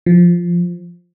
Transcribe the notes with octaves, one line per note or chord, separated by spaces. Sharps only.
F3